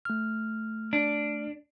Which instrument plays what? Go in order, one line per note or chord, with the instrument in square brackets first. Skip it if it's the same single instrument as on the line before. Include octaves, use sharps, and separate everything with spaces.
[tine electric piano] A3 F6
[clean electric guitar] D4